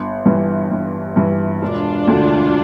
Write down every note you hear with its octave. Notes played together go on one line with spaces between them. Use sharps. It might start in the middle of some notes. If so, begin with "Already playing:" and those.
Already playing: G1
G2 E3
G1
G2 E3
E1 D4 F4
D2 D3